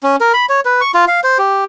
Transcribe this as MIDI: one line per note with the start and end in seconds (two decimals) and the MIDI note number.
0.03 0.16 61
0.21 0.32 70
0.34 0.46 83
0.49 0.60 73
0.65 0.81 71
0.81 0.91 85
0.94 1.05 65
1.08 1.20 77
1.24 1.38 72
1.39 1.64 67